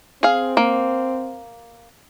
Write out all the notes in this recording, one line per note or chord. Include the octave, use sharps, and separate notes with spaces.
C4 G#4 F5
A#3